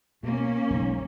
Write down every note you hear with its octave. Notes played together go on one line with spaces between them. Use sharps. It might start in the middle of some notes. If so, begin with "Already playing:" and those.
B2 A#3 C#4
F#1 B1 G#2